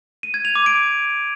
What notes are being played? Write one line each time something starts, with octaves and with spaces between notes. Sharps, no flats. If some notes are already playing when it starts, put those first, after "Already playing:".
D#7
G#6
F7
D6
D7